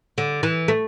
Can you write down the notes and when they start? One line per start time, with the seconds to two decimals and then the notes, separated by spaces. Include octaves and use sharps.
0.18 D3
0.43 E3
0.68 A3